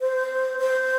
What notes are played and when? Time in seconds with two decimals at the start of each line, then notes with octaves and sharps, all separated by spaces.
0.01 C5
0.59 C5